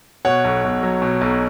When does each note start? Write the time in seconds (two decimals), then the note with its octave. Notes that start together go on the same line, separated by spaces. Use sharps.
0.25 B2 C#5 F#5
0.44 B1
0.64 B1
0.83 F#3
1.02 B2
1.21 B1